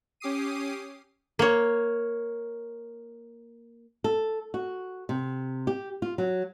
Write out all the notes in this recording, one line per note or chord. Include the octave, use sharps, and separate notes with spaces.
C#4 G4 D6 D#6 C7 D#7
A#3 C#5
A4
F#4
C3
G4
F4
F#3